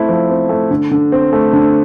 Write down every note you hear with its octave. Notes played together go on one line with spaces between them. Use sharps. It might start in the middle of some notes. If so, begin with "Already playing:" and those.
Already playing: A3 C4 E4
F3
C4
A3
D3
D3
C4
A3
D3